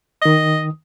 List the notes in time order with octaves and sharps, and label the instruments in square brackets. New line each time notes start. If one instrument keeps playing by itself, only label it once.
[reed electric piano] D#3 D#6 [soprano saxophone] D#5